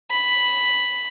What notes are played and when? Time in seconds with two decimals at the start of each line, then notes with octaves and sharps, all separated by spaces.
0.11 B5